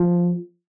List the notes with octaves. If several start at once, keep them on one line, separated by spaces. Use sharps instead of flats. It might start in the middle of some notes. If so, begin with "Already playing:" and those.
Already playing: F3